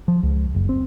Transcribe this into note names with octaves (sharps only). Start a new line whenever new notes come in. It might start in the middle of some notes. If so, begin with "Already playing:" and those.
F3
C#2
F#1
C4